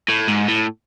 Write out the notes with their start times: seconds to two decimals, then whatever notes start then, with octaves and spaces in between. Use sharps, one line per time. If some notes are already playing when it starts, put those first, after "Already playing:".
0.08 A2
0.28 G#2
0.48 A2